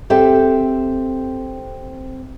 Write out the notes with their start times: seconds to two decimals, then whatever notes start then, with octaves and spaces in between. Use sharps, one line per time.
0.10 C4 G4 A4 E5